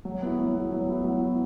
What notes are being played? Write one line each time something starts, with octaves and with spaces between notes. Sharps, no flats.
F#3
B3 E4
F#3
B3 E4
F#3
B3 E4
F#3
B3 E4